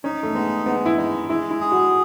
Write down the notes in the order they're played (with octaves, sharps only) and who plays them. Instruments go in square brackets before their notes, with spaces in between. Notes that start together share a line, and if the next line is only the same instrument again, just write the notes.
[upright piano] C#4 [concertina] D#4
[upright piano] A3
[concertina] G#3 [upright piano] B3
[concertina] G#3 [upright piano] B3
[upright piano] E4
[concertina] G#3 [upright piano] D#4
[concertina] G#3 [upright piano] E4
[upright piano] E4
[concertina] G#4
[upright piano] F#4